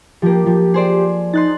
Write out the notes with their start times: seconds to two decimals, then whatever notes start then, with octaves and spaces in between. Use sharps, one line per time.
0.22 F3 A#3 G4
0.46 F3
0.74 G#4 C5 D5
1.33 D#4 C6 F#6 A6